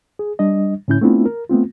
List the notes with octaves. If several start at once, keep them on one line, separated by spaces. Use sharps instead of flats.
G#4
G3 D4 D#5
A2 D3 C#4 E4 G6
A3 B3 C4 D4 E4 F4
A#4
A3 B3 C4 F4